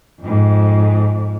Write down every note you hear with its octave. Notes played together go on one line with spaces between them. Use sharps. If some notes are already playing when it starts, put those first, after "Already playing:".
F2 G#2